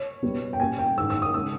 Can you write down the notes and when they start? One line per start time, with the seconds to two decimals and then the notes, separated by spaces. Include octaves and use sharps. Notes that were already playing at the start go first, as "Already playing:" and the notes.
Already playing: C#5
0.23 B2 G3 B3
0.53 G5
0.59 A#2 G3 C#4 G#5
0.79 G5
0.97 G#2 D#3 A#3 E6
1.10 E6
1.22 D#6
1.34 C#3 G#3 D#4 E6